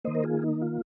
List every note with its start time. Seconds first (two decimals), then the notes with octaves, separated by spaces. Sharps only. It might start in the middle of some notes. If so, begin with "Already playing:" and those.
0.05 D#3 A#3 C5 D#5
0.15 A#4
0.24 F4 G#4
0.42 D#4
0.62 F4